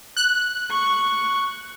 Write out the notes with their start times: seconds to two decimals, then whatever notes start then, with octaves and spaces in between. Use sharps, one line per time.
0.17 F#6
0.71 C#6